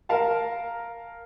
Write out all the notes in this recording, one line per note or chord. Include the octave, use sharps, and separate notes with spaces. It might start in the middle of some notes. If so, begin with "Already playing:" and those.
A#4 F5 A5